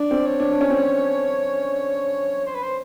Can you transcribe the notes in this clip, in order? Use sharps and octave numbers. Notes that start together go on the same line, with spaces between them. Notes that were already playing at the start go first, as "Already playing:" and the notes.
Already playing: D4 D5
C4
C#5
D4
D4
C#4
C4
C5
B4
C5